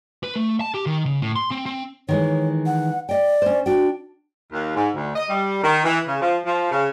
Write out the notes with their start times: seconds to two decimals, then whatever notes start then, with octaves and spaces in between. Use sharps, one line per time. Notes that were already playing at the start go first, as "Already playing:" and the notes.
0.23 B4
0.36 A3
0.60 A5
0.74 G4
0.86 D#3
1.06 C#3
1.22 A2
1.36 C6
1.51 C4
1.66 C4
2.09 D#3 E3 G#3 C#5
2.66 F#5
3.09 D5 D#5 G5
3.42 C#4 C5
3.66 D4 F#4 G5
4.52 D#2
4.76 G#2
4.95 D2
5.16 D#5
5.29 G3
5.63 D#3
5.85 E3
6.07 C#3
6.21 F3
6.46 F3
6.71 C#3